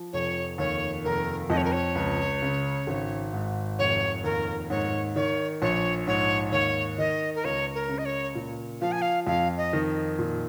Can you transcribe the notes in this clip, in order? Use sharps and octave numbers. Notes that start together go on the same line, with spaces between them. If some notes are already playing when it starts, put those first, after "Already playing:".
Already playing: F3
F1 C#5
D#2 C#5
F1 A#4
F2 D#5
C#5
A#4
C#5
C#2
C#3
G#1
G#2
F1 C#5
D#2 A#4
G#2 C#5
D#3 C#5
A#1 C#5
G#2 C#5
D#2 C#5
D#3 D#5
A#4
C#2 C#5
A#4
C#3
D#5
C#5
A#2
F3 F5
G#5
F5
F2 F5
D#5
D#3
A#2